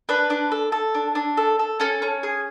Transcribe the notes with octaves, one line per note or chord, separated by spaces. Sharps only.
D4 B4
D4
A4
A4
D4
D4
A4
A4
C#4 A4
C#4
G#4